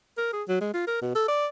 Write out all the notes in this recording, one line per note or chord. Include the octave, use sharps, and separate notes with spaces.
A#4
G#4
F#3
G#3
F4
A#4
B2
A4
D5